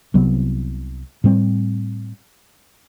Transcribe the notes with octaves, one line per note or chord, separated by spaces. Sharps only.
C2 C3 F#3 B3
A2 G3 C4